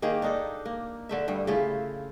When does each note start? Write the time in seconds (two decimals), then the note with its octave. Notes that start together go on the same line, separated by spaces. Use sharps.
0.02 D#3 A#3 G4 G#4
0.22 D4 D#4 A4
0.65 A#3
1.09 D3 A3 E5
1.28 G2 G3
1.47 C#3 A3 E4 F4